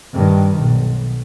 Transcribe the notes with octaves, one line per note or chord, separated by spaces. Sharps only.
G2 D#3
B1